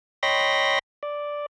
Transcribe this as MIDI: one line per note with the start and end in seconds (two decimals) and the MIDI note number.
0.23 0.79 73
0.23 0.79 75
0.23 0.79 79
0.23 0.79 83
0.23 0.79 84
0.23 0.79 94
1.03 1.46 74